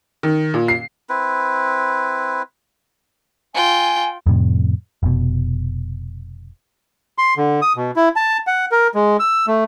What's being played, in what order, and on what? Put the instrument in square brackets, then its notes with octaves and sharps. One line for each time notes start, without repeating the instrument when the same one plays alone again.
[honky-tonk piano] D#3
A#2
C7
[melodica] C4 E4 B4
[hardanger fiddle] F4 G5 [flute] G#5
[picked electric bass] F2 A2 C3
F1 B2
[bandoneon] C6
D3
D#6
B2
E4
A5
F#5
A#4
G#3
E6
A3